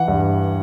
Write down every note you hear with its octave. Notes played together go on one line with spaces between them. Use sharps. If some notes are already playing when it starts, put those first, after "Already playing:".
Already playing: E3 F#5
G2